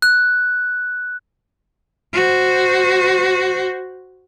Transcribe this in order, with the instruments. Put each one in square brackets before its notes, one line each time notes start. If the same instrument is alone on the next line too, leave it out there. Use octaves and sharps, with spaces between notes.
[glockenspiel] F#6
[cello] F#4 C5